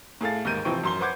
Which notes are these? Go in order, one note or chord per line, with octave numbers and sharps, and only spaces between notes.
A2 G#4 A4 F5 A6
D#2 G#2 A#4 G6 D#7
F1 E3 F3 C4 G5 C#6
F#2 C6 G7
B4 C5 F#5 D6 G6 G#6